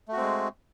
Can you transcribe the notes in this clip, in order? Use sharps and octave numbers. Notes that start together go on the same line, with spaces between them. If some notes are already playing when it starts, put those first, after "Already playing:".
G#3 A3 C4 F#4